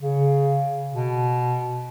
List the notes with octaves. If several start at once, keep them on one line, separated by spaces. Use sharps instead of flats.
C#3
B2